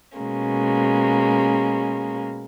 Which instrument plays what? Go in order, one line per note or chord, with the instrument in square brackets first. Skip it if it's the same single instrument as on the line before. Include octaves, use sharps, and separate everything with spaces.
[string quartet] B2 G#3 A#3 C#4